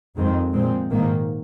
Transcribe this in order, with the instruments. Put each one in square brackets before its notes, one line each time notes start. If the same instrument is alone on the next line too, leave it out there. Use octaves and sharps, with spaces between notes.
[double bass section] F2 D#3 G#3 C4
A#2 G#3 C4
G#2 D#3 A#3